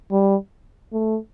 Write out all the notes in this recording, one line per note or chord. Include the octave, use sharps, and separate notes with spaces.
G3
A3